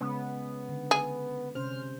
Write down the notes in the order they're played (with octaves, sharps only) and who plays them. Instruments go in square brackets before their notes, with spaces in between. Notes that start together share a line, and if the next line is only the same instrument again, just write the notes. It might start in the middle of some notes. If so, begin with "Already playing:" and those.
[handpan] C#3 G#3 C#4 [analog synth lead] B3
[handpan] D3
[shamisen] G#4
[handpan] C3 C#4 C5 [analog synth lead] F6